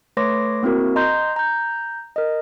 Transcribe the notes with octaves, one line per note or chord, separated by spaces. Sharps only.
A3 B4 C#5 C6 D6 A#6
A#3 C4 E4 F#4 A#4
D#5 A#5 C6 G6
A#5 G6
A#4 D#5